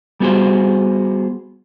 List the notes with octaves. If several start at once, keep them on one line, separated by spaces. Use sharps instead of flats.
G3 B3 F#4 G#4 C5